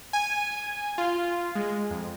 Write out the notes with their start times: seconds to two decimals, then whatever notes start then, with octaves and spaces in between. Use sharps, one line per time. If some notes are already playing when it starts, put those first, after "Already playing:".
0.13 G#5
0.98 F4
1.55 G#3
1.90 F2